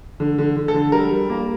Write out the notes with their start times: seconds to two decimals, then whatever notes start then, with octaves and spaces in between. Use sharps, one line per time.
0.20 D3
0.38 D3
0.56 D3
0.68 A4
0.74 D3
0.92 G3 A#4
1.11 G3
1.29 A#3